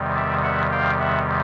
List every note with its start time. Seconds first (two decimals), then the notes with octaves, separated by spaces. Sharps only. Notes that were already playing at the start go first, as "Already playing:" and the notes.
Already playing: E2 C3 D#3 G3
0.15 D5 E5
0.43 E5 F#5
0.71 F5 G5
0.99 E5 F#5